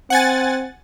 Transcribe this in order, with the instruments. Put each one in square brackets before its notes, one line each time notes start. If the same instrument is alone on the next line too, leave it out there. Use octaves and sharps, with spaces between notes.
[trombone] C4 [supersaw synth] F#5 G#5 A6